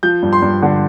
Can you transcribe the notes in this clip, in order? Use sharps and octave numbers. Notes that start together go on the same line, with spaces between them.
F3 G6
G2
C6
G2
D3